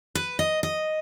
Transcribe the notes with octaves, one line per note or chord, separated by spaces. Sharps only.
B4
D#5
D#5